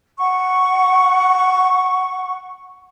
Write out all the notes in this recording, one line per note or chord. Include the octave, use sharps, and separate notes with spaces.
F#5 C#6